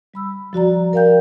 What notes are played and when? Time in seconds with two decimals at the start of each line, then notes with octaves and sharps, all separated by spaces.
0.14 G3 B5 E6
0.53 F3 F#4 D5 A#5
0.93 A#4 D5 F5 G5 G6